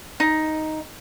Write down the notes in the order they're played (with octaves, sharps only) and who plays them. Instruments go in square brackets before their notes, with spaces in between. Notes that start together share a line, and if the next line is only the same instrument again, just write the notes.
[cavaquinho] D#4